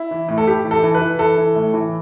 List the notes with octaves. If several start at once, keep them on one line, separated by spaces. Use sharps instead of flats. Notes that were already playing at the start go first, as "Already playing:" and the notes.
Already playing: E4
E3
A2
A4
A2 G4
E3
A4
E3
B4
E3
E3 A4
E3
A2
E3